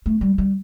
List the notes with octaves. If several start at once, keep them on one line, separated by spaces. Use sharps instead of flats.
A3
G3
G3